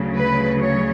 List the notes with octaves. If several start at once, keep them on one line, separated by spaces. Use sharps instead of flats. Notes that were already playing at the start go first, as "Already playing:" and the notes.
Already playing: D2 C#3 F#3
B4
C#5